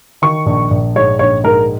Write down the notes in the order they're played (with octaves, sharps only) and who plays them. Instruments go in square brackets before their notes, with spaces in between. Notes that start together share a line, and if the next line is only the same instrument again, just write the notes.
[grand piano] D#3 C#6
A#1
A#1
G#2 C#5
A#1 C#5
G#2 A#4